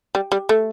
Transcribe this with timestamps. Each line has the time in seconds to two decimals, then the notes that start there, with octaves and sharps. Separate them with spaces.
0.15 G3
0.32 G3
0.49 A3